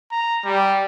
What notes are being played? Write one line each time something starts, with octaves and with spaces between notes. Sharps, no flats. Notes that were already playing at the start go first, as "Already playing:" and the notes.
A#5
G3